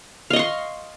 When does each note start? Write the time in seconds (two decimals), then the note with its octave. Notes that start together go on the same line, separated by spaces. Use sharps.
0.30 F5
0.33 D#5
0.36 C#6
0.39 C6